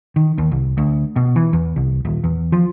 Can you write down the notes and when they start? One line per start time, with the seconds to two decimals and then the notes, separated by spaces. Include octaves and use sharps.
0.16 D#3
0.38 D#2
0.52 C2
0.78 D2
1.16 B2
1.36 E3
1.53 E2
1.76 C2
2.05 D#1
2.24 E2
2.52 F3